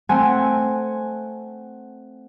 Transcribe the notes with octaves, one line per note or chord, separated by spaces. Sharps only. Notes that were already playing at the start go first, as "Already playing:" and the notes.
A3 C4 F#5 G#5